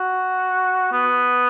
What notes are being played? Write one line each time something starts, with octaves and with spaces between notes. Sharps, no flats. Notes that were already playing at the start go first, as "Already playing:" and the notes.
Already playing: F#4
B3